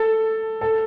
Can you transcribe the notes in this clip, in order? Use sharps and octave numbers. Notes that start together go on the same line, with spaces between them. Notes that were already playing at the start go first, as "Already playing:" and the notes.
Already playing: A4
A4